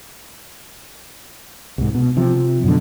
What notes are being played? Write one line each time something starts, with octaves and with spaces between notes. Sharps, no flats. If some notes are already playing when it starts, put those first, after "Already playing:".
C2 G#2
B2
C3 F3
F#2 B2 D3